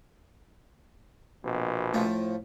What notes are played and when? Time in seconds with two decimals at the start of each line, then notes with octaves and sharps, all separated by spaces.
1.44 A#1 B2
1.94 A2 F3